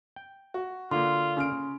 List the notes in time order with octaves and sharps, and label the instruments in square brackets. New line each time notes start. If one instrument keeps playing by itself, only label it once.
[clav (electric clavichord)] G5
[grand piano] F#4
[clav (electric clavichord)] D3 A#3 [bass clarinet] F4 [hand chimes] C6
[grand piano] C#3 F6 D7